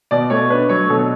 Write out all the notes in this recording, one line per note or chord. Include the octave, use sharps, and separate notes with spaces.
B2 D5
A3 C#5
D4 B4
F#3 C#5
B2 A4